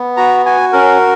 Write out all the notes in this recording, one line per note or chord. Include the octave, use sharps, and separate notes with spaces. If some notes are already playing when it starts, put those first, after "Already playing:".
Already playing: B3
F#4 A#5
F#4 G#5
C#4 A#4